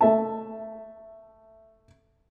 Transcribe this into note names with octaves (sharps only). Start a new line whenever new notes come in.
A3 E5 A5